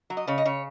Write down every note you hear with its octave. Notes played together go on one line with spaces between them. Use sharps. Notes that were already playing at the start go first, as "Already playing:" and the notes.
F#3
D#5
C#3 C#5
D#5
C#3 C#5